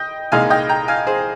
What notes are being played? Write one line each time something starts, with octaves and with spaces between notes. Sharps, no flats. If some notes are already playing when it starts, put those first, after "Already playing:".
Already playing: D#5 G5
C2 A#2 G#3 D#4 F5 G#5
D#5 G5
G5 A#5
F5 G#5
G#4 C5